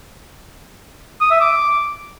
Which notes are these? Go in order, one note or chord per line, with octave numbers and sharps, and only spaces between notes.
D#6
E5
D6